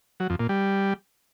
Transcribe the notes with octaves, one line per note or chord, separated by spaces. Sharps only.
F#3
F2
A#2
G3